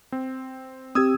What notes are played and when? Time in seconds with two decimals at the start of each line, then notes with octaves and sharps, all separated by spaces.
0.12 C4
0.95 C4 G4 D#6 E6 G#6